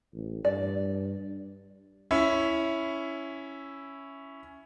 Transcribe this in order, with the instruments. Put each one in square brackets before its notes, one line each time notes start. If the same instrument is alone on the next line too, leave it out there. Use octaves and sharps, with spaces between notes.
[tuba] A1
[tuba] G2 [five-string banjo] D5
[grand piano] C#4 E4 E5